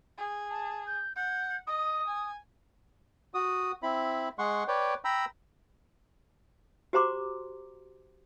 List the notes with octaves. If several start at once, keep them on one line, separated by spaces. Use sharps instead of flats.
G#4
A5
G6
F#5 G6
D#5 D#6
G#5
F#4 D#6
C4 E4 B5
G#3 F#5 C6 C#6
B4 C#5 D5 G5
G5 A#5 B5 E6
F#4 G4 C5 A#5 C6 D6